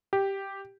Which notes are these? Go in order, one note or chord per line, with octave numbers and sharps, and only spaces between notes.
G4